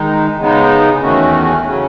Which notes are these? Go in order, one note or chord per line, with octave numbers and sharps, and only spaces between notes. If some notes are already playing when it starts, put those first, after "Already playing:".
Already playing: D#3 G#3 D#4
C#3 G#3 B3 D#4
E2 D#3 A3 C#4 F#4
C#3 F#3 C#4